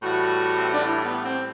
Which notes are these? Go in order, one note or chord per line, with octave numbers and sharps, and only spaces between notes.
A2 E3 G3 F#4
C4
D4
E4
B3
C4